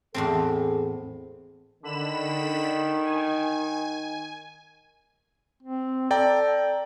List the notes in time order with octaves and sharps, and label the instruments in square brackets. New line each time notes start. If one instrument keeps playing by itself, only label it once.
[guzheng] E2 A2 C4 [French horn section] G#4 A4
[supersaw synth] D3 B5 E7 [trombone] D#3
[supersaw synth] G#5
[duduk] C4
[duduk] A4 [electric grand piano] D5 G5 A#5